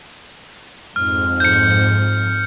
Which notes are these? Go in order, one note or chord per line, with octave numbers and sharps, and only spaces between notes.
F2 G#2 F6
G6 C#7